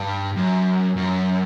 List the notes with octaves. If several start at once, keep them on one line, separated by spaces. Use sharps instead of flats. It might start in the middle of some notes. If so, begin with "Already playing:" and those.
Already playing: G2
F#2
F#2